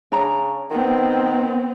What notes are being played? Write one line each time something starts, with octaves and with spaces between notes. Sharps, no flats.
C#3 D4 A#5
D#3 B3 C4